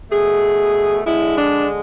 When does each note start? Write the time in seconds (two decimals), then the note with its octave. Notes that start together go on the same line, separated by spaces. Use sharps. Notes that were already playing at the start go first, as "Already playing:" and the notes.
0.11 B2 A3 G#4
1.05 D3 G#3 E4
1.36 D4